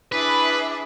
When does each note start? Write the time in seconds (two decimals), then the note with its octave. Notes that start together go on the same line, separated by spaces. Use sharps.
0.12 D4 E4 G#4 B4